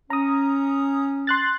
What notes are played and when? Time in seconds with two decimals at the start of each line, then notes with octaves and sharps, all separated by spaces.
0.10 C#4 A#5 D#6
1.27 C6 F#6 A6